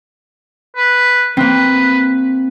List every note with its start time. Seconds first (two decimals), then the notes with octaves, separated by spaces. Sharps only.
0.77 B4
1.37 A#3 C4 B4